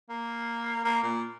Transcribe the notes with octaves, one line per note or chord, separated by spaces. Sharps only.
A#3
A#3
A#2